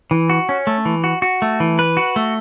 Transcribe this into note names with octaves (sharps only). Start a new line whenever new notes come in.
E3
F#4
C#4
A3
E3
F#4
F#4
A3
E3
B4
F#4
A3